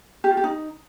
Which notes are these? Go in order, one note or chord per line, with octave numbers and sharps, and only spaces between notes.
G4
F4
G4
D#4